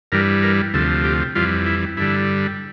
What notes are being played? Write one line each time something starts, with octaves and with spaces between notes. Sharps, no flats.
G2 E3 G3 A#4
A#4
D2 C3 F3 A4
G4
F2 E3 G3 F4
E4
G2 D3 G3 E4